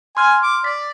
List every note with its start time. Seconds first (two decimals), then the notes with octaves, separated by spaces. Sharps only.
0.17 G#5 C6 F6
0.43 D6
0.64 D5 B6